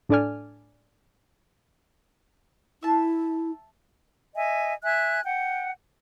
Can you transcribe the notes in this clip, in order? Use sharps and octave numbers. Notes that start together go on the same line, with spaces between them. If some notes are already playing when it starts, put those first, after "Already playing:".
A2 D4 A4 D5 G#5 F6
E4 E5 A5
D#5 E5 G#5
E5 G#5 F#6
F#5 G5